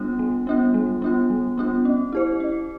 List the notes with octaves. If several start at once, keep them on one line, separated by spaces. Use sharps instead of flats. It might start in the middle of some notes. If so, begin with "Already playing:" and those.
Already playing: G3 B3 D4 F4
G3
B3 D4 F4
G3
B3 D4 F4
G3
B3 D4 F4
C#4
E4 G4 C5
C#4